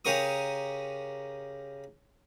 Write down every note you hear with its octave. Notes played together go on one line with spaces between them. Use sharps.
C#3 G4 A#4 C#6 D#6